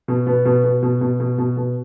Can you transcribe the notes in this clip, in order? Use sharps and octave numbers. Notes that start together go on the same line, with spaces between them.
B2
B2 B3
B2
B2
B2
B2
B2
B2
B2